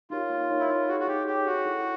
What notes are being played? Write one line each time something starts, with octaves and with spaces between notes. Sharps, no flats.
D#4 F4 G4 A#4 C#5
A#3
D#4 G4 A#4 C#5
E4
D#4 F4
F#4 G#4 C#5
F#4
D#4 G4
G4 G#4 C#5
C#4 F#4
E4 A4